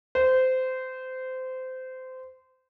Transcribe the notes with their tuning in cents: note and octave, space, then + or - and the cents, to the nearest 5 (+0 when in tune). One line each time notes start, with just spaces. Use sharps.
C5 -20